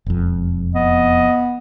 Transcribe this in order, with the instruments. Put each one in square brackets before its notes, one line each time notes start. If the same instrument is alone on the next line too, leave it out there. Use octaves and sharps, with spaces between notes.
[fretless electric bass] E1 F2
[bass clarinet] B3 [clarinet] D#5